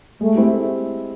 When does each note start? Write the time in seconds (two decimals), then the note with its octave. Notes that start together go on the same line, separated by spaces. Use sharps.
0.20 G#3 A3
0.35 C4 E4 G4